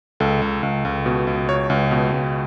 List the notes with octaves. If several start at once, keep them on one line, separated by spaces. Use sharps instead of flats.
C#2 A4
C#2
C#2
C#2
B2
C#2
C#2 C#5
C#2
B2
C#2